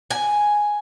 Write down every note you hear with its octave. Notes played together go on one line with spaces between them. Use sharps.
G#5